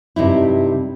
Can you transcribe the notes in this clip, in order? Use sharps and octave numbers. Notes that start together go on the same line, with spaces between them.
G2 C3 D#4 E4